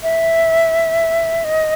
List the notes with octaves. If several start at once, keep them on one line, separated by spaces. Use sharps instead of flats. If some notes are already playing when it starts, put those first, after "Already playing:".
E5
D#5